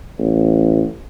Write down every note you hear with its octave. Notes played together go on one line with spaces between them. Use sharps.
A1